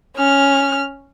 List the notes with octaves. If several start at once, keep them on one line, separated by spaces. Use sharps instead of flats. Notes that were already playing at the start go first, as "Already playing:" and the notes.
C#4 F6